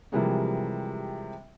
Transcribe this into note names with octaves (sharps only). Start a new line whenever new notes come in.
C3 E3 F3 G3 G#3 A#3